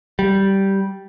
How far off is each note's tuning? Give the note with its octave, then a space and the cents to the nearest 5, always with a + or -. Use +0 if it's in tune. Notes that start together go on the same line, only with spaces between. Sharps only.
G3 -10